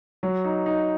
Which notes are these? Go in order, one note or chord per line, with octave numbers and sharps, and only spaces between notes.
F#3
D#4
D#4